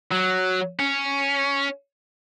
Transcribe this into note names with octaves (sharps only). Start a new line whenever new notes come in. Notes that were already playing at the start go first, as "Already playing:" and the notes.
F#3
C#4